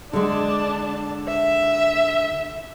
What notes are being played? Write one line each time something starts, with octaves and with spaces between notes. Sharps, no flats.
D3 G#3 D4 A5
E5